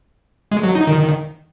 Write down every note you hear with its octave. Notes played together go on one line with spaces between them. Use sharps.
G#3
F#3
D#4
D#3